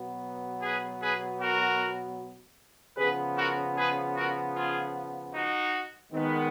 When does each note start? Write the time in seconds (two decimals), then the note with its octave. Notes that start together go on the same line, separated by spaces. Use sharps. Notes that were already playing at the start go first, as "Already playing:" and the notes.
Already playing: B2 F#3 B3
0.62 G#4 B4
1.01 G#4 B4
1.40 F#4 A#4
2.97 C#3 F3 B3 G#4 B4
3.36 F#4 A#4
3.76 G#4 B4
4.15 F#4 A#4
4.55 F4 G#4
5.34 D#4 F#4
6.12 D#3 G#3 B3